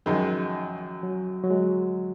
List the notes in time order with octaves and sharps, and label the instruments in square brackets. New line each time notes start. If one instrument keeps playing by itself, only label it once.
[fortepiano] F#2 D#3 G#3 [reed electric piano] F3
[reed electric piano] F#3
F#3
G#3